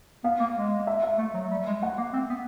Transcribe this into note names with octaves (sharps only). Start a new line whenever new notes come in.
B3 F5
A#3
G#3
E5
E5
A3
F#3
G3
G#3
A3 F#5
A#3
C4
B3